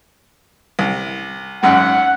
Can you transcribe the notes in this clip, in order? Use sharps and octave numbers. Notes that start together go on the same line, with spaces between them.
C2
G#1 F#2 F#5